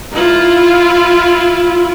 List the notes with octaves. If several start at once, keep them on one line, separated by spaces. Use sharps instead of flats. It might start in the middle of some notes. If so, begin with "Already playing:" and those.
E4 F4